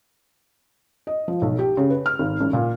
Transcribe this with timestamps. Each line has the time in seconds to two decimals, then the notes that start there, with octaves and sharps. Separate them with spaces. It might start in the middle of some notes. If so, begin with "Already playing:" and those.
1.07 D#5
1.28 F3
1.42 B1
1.59 G4
1.77 C#3
1.90 B4
2.06 F6
2.19 G#1
2.41 A1
2.53 A#2